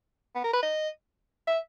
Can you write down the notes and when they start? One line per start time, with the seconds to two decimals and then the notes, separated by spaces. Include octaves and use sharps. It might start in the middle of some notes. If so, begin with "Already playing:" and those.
0.35 B3
0.44 A#4
0.53 B4
0.63 D#5
1.47 E5